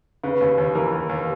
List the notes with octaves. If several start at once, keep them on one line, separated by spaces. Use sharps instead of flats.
C#3 B4
D#2
D#2
E3 A#4
D#2
D#2